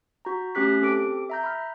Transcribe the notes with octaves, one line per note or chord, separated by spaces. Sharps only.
F#4 A#5
A3 C#4 G4 F#6 B6
C4 G4 A4 D6 D7
E5 A#5 G6
B5 F6